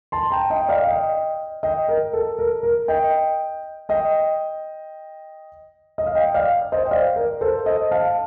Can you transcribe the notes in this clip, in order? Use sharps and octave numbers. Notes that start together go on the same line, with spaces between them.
A5 C6
G5 A#5
D#5 G5
D5 F5
D#5 G5
D#5 G5
A#4
A4
A#4
A#4
D#5 G5
D#5 G5
D#5
F5
D#5 G5
D5 F5
C5 D#5
G5
D5 F5
A#4
A4 C5
C5 D#5
F5 A5